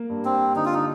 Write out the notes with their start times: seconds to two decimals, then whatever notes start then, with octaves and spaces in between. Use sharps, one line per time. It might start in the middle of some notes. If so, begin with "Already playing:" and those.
Already playing: A#3
0.10 G2
0.25 C4
0.56 D3 D#4
0.65 F4
0.74 D#4